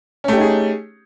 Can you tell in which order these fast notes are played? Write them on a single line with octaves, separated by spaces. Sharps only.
C#4 A3 G4 D#4 G#4